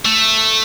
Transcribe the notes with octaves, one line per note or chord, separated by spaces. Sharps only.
A3